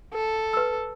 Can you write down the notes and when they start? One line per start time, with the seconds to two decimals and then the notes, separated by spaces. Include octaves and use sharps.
0.14 A4
0.53 B4 E6